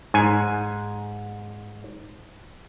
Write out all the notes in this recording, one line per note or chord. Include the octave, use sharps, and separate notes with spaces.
G#2 G#5